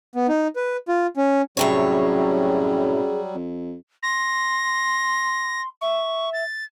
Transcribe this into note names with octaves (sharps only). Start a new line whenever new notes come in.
B3
D#4
B4
F4
C#4
F#2 A2 C3 F#3 G3 G#4 C#5
F2
C6 A#6
E5 C#6
A6